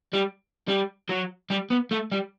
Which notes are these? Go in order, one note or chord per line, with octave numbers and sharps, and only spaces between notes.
G3
G3
F#3
G3
B3
A3
G3